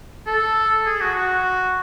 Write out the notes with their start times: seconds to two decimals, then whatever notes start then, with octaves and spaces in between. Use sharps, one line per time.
0.27 A4
0.86 G#4
1.01 F#4
1.16 F#4